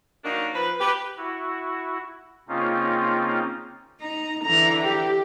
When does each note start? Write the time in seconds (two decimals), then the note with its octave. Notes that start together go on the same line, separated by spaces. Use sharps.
0.24 D#3 F#3 A#3 D4 D#4
0.53 F3 B4
0.78 G4 B4
1.17 E4 F#4
2.49 C#3 A#3 C4 C#4 D#4 F4
4.02 D#4 A#5
4.45 D3 E3 A#5
4.82 G4